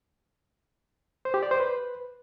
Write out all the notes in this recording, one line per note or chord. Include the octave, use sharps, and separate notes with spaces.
C5
G4
D5
C5
B4